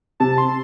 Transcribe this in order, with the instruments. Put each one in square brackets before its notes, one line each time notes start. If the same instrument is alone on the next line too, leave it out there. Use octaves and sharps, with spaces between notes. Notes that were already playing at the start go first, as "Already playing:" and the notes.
[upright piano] C3 [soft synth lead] A5
[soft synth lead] C6